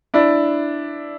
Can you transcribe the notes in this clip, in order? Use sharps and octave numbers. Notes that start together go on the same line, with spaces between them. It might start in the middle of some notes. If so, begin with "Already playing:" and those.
D4 E4